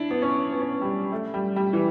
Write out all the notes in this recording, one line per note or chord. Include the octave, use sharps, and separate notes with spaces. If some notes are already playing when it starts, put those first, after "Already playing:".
Already playing: D4 E4
B3
C#4
B3
C#4
B3
G3
A3
G3
G3
E3